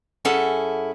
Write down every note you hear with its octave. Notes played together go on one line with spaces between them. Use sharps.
F#2 C#4 E4 G#4 A4 F#5